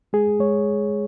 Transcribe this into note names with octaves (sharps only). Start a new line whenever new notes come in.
G#3 G#4
G#3 C#5